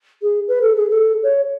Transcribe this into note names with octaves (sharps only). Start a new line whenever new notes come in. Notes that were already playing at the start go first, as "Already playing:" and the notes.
G#4
B4
A4
G#4
A4
C#5